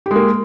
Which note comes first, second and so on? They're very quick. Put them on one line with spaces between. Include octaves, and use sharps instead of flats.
G4 G#3 A#3